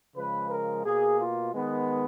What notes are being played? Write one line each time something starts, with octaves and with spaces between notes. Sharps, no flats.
C#3 F3 G#3 B4
A#4
B2 A#3 G#4
F4
D#3 G#3 B3